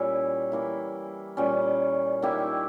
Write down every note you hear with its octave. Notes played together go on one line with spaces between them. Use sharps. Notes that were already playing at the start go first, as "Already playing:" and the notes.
Already playing: A#2 G3 C#4 E4
E3 A#3 E4
A#2 G3 C#4
D#3 A#3 E4 G4